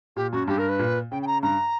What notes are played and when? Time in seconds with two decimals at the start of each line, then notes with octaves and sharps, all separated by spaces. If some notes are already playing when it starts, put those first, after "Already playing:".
0.16 A#2 G4
0.32 F#2 F#4
0.48 G2 G4
0.58 A#4
0.69 B4
0.79 A#2
1.11 C#3 G5
1.22 G5
1.27 A#5
1.43 G2 A#5